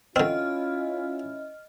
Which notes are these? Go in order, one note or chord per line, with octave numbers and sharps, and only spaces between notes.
D3 C4 C#4 E4 F4 D#5 F6